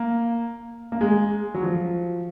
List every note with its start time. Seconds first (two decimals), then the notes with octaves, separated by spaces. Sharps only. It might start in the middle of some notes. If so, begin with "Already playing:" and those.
Already playing: A#3
0.92 A#3
1.01 G#3
1.54 F#3
1.63 F3